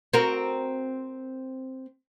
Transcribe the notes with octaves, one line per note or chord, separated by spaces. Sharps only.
C4 F#4 A#4